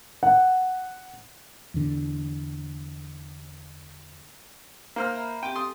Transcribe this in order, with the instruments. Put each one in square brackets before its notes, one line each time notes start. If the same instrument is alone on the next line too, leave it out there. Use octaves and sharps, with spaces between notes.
[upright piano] F#5
[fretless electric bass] E2 D3
[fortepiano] A#3 C5 F6
[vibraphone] E5 A#5 B5
[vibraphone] C4 G4 [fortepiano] G5
[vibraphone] A4 [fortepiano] C6 D#6